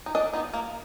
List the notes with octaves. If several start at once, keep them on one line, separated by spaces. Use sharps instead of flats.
D#4
D4 D#5
B3 D#4
A#3